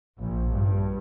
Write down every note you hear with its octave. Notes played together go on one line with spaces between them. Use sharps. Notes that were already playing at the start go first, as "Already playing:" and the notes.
A#1
G2